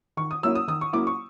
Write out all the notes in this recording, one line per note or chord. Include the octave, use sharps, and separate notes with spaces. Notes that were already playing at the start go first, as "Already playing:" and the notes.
D#3 C#6
D#6
F#3 A#3 C#4 E4 E6
D#6
D#3 D#6
C#6
F#3 A#3 C#4 E4 D6
C#6